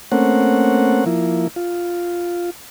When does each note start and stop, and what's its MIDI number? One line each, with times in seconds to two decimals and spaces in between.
0.12 1.05 57
0.12 1.05 58
0.12 1.05 60
0.12 1.05 61
0.12 1.05 78
1.06 1.48 53
1.06 1.48 58
1.06 1.48 64
1.56 2.50 65